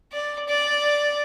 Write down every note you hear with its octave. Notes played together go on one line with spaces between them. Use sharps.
D5
D5